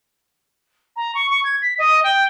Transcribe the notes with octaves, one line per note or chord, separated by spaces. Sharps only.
A#5
C#6
C#6
G#6
B6
D#5
G5